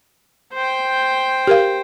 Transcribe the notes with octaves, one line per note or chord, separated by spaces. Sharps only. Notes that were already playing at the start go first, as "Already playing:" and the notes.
C5 G5
G4 A#4 F5